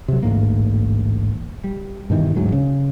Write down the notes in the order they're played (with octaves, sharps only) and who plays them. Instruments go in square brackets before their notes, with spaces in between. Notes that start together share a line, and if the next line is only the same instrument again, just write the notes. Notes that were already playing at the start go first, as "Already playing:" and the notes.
[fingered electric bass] C3 F#3
A1 D2 G#2 A#3
G3
G2 B2 D#3 E3
D2 G#2 F#3 G#3
C#3